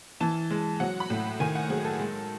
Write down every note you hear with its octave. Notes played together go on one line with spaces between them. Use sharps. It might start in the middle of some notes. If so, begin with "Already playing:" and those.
E3 A5
G#3
F#3 F#5
B5
A2
D#3 G#5
F#5
F#3 G#4
A4
G#3